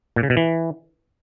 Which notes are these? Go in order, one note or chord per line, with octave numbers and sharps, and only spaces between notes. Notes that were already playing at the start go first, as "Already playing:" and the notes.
A#2
C#3
B2
E3